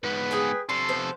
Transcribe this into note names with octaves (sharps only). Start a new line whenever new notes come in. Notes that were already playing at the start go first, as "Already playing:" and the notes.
G#2 B3 B4
G#4 G5 G#5
C3 D4 A4 C6
F3 B3 C5